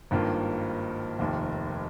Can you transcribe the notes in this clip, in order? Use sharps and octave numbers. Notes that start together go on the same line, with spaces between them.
G#1 G2 D#3 A#3 F4
F1 D#2 D#3